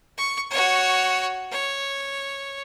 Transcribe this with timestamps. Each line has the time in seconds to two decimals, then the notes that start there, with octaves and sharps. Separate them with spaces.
0.18 C#6
0.51 F#4 C#5
1.51 C#5